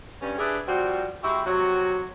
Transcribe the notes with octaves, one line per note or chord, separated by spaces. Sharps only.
G2 C#4
D4 E4 G4 G#4 B4
F3 G3 C4 F#4
G#3 E4 F#4 G4
C3 F#3 F#4